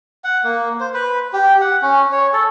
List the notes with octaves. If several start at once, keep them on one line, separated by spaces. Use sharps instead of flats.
F#5
A#3
C5
B4
G4
F#5
C#4
C#5
A4